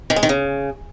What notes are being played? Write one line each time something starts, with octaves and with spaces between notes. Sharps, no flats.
D#3
G#3
D#3
C#3